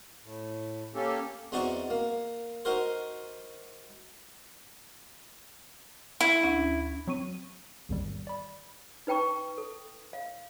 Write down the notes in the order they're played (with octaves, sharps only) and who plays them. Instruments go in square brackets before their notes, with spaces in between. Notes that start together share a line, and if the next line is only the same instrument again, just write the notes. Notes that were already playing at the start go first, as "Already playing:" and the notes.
[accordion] A2
A#3 C#4 G4 A4
[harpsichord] E2 C4 D#4 F#4 D5 C#6
A#3
D#4 F#4 A#4 C5
[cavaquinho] E4
[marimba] D2 C#4 D4
[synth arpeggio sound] F#3 C4 C#6 D#7
A1 E2 G#2 D#3 G3
D5 B5
[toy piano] D#4 B4 G5 A5 C#6
A4
F5